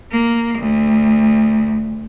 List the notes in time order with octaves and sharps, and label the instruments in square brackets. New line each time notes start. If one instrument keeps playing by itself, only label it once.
[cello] A#3
D2